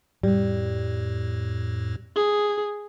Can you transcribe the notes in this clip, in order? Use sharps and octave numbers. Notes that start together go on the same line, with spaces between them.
F2 A2 G3
G#4